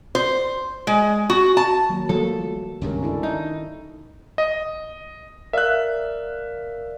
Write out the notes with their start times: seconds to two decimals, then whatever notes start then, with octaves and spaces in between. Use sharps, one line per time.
0.15 C5
0.87 G#3
1.30 F#4
1.57 A5
1.89 D#3 F#3 A#3
2.09 F3 G3 A3 A#3 A4
2.82 C#2 G2 C3 D#3 C#4 A#4
3.03 D4 E4 A4
3.23 D#3 D#4
4.38 D#5
5.53 A#4 D5 E5 F5 F#6